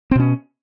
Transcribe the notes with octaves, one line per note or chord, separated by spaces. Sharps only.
B2 C4 C#4